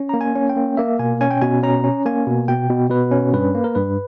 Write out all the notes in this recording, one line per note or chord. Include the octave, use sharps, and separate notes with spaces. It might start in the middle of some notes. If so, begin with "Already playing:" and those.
Already playing: C#4
A#3 A#5
G#5
C#4
G5
A#3
A#3 E5
B2 G#5
C#4 G#5
G5
B2 G#5
C#4 A#5
C#4
A#3 G#5
B2
B2 G5
B2
B2 B4
C#4
G2 B4
A#3
A#4
G2 B4